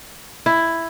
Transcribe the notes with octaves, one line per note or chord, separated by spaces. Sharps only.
E4